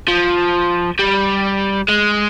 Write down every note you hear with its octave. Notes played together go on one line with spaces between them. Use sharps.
F3
G3
G#3